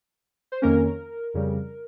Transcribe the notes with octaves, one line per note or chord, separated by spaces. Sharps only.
C5
F2 D#3 A#3 C#4 A#4
F2 C#3 G3